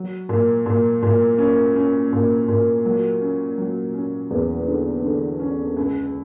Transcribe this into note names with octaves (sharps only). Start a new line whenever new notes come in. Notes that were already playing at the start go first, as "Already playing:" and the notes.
Already playing: F#3
A#2
A#2
A#2
C#4
C#4
A#2
A#2
F#3
C#4
F#3
C#4
E2
D3
D3
C#4
C#2